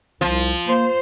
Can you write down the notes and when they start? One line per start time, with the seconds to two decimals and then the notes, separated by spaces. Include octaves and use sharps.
0.21 C2 F3
0.66 A#3 C5